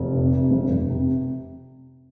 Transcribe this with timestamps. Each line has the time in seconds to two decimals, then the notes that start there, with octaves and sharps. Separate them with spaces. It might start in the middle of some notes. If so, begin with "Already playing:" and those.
Already playing: F1
0.13 C3
0.32 C3
0.51 F1
0.70 F1
0.90 C3